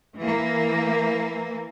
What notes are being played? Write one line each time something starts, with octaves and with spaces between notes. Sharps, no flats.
E3 A#3